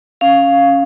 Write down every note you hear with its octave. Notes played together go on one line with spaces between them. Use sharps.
C#4 F5
C#4